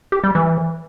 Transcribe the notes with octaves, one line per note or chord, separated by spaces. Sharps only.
G4
G3
E3